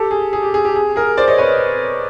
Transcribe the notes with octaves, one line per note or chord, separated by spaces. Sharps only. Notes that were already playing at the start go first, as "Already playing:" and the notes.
Already playing: G4 A4
G#4
G#4
G4
G#4
G4
G#4
G#4 A#4
C5 D5
C#5 D#5
B4 C#5